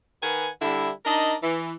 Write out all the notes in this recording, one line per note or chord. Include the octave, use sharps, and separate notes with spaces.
D#3 B4 F#5 G#5
D3 G3 E4
D4 D#4 A#4 D#5
E3